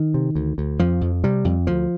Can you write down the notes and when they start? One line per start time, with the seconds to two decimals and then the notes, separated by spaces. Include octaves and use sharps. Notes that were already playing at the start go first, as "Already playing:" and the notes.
Already playing: D#3
0.14 C3
0.35 D2
0.58 D2
0.79 F2 F3
1.01 F2
1.24 C3 G3
1.45 F2
1.67 D2 F3